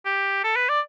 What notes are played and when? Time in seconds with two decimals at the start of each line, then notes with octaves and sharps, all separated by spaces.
0.05 G4
0.44 A4
0.56 B4
0.69 D5